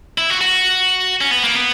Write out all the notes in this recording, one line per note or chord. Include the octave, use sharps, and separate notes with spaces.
E4
F#4
F#4
C#4
B3
A#3
B3